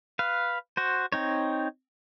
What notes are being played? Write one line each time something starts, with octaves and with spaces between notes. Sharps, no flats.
B4 F5
F#4 C5
C4 D#4 C#5